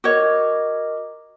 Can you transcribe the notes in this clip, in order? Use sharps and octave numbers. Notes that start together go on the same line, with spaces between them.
F#4 A#4 C#5 D#5 D6